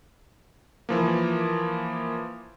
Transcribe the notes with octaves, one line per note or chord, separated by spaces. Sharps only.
E3 F3 A#3